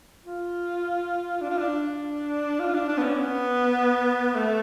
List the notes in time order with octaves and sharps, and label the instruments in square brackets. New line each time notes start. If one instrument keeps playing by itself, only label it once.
[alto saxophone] F4
D4
F4
D4
F4
D4
D4
B3
C#4
B3
A3